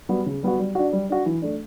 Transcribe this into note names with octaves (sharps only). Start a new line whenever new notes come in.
G3 B3 F#4
C#3
G3 B3 F#4
G3
D4 F#4
G3
D4 F#4
E3
A3 D4